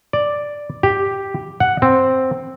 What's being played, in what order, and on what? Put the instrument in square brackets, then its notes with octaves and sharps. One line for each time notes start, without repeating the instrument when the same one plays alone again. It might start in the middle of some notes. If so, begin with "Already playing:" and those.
[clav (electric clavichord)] D5
G4
F#5
C4